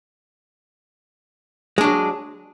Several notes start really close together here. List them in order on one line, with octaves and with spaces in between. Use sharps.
G#3 D4 F#3